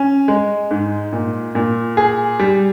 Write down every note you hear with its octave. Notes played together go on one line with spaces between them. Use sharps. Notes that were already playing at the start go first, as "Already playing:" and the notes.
Already playing: C#4
G#3
G#2
A#2
A#2
G#4
G3